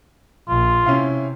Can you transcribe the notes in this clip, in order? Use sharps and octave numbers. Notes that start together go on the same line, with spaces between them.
A#1 F4
C3 C#4 E4 F5